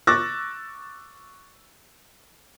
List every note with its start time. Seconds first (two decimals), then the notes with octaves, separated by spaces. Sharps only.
0.07 C#6 D6 E6 F#6 A6 A#6